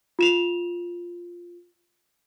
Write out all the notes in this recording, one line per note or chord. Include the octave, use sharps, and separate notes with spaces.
F4 E7 F7